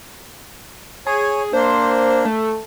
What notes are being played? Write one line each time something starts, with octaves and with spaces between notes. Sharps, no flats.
G#4 C#5 G#5
A#3 D4 C5
A3